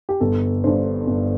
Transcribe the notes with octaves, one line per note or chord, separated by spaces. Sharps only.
G4
G1 A4
G2 D3 C5
G1